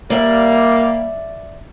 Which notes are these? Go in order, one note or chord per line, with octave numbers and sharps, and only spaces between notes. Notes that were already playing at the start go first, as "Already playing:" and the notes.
G3 A#3 D5 E5